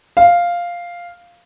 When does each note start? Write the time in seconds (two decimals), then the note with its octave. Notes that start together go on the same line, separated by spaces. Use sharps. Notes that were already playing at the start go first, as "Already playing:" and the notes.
0.17 F5